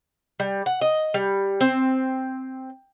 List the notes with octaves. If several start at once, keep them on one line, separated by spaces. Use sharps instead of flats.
G3
F#5
D#5
G3
C4